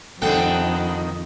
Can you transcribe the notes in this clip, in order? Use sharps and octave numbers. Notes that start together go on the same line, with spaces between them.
F2 B2 D#3 D4 A4 F#5 G5